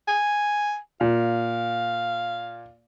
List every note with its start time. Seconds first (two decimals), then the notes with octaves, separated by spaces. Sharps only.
0.08 G#5
1.01 A#2 F5